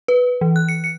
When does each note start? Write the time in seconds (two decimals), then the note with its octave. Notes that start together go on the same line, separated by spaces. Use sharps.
0.08 B4
0.41 E3
0.56 F#6
0.69 C#7
0.84 C#7